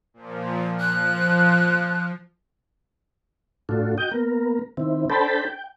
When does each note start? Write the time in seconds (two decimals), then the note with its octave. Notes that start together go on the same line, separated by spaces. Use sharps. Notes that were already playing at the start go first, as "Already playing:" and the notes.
0.14 A#2 F3
0.80 F3 F#6
3.69 A2 D4 F4 F#4 A4
3.98 F#4 D#5 G5 G6
4.11 A#3 B3 A#4
4.77 D#3 C4 E4
5.10 D4 A4 C5 G5 A5 B5
5.46 G5